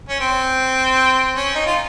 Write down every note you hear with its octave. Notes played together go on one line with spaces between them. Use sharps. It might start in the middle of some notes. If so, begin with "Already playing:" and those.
C#4
C4
C#4
D#4
F4